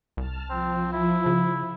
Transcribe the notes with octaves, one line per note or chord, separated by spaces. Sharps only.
C2 A5 F6
F3 C4
E4
C#3